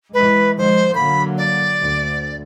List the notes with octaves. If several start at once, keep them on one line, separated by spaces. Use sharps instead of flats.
E3 G#3 B4
D#3 F3 G#3 C5
D3 F#3 A#3 B5
D5
D2